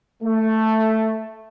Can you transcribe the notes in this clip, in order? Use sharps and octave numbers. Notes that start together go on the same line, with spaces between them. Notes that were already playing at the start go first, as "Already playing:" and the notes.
A3